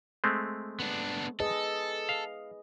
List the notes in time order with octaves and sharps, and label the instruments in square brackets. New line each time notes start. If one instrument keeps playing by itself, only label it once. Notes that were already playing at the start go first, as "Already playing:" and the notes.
[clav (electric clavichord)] G#3 A3 C4
[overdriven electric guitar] B3 D4
[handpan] G#4 B4 D#5 [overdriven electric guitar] A4
[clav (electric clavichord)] F5